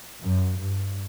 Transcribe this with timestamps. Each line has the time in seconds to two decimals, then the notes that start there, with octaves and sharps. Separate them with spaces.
0.22 F#2
0.60 G2